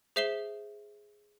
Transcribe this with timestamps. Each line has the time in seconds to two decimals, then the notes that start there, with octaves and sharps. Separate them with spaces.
0.16 G#4 C5 E5 C7 E7 G7